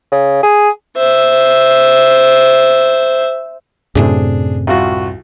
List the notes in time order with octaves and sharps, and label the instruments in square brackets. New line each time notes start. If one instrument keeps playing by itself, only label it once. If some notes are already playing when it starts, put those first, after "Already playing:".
[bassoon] C#3
G#4
[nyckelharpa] C5 E5
[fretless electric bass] F#2 A2 C3 [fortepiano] D4 G#4
[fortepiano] C2 F4 F#4